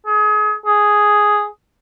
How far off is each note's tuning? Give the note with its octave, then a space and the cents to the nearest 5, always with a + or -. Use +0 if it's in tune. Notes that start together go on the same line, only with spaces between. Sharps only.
G#4 +30
G#4 +0